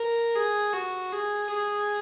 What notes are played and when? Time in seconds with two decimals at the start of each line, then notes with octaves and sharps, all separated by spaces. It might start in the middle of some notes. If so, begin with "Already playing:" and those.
Already playing: A#4
0.35 G#4
0.73 F#4
1.12 G#4
1.49 G#4